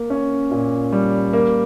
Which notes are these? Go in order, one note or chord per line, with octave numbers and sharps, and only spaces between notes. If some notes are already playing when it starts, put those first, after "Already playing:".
Already playing: A#3
C#4
A#2
G3
A#3